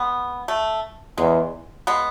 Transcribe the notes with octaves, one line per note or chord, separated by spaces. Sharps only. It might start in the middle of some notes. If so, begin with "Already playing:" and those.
Already playing: G#3 B3
A3
E2 G#3
G#3 B3